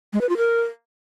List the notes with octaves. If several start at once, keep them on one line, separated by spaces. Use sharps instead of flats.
G#3
B4
F4
A#4